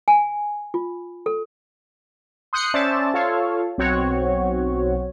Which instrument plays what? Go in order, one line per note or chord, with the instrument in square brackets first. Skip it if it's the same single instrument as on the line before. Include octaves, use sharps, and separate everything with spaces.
[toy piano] G#5
F4
A4
[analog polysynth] C6 D#6 F#6 G6 C7 C#7
C#4 C5 D5 E5 A5
F4 A4 C#5 F5
B1 C4 F#4 C#5